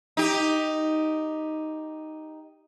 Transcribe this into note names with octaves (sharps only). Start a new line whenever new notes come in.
D#4 G4